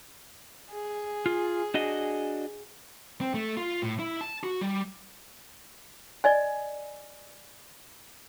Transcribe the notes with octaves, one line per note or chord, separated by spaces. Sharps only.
G#4
F4
D4 F#4 D#5
C4
A3
F4
A2
E4
A5
F#4
G3
D5 D#5 G#5